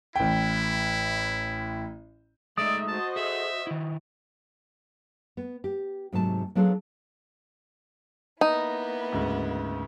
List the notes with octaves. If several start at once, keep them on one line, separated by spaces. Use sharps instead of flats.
A1 E4 G5
G#3 A3 D#4 D5 E5 D#6
F#4 C5 D#5 A5
G#4 A4 E5
D#3 E4
B3
G4
G#2 C3 F#3 A3 A5
F#3 B3 D4 F4 G#4 A4
A#3 B3 D#4 E4
D2 G#2 C#3